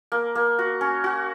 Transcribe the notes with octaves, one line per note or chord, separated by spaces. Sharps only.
A#3
A#3
F#4
C#4
F#4